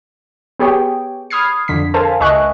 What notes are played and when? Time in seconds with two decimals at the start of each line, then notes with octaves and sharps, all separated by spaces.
0.59 B3 G4 G#4 C#5 G5
1.30 B5 D#6 F6 G#6 C7
1.68 F2 D3 B6
1.94 A4 A#4 C5 F5 G#5 A5
2.20 C#2 D#5 E5 G#5 C#6 F#6